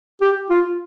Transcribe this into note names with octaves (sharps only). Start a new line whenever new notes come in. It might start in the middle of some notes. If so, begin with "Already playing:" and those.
G4
F4